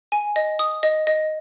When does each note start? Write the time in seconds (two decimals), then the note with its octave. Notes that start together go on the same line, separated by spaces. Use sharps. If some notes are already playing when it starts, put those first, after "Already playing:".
0.12 G#5
0.36 D#5
0.59 D#6
0.83 D#5
1.07 D#5